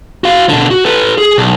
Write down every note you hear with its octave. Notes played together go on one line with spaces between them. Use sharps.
F#4 F5
B2 D3
F#4
A4 B4
G#4
B1